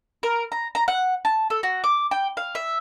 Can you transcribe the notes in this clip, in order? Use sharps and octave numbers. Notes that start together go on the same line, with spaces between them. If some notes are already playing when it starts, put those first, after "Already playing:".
A#4
A#5
A#5
F#5
A5
A4
F#4
D6
G5
F5
E5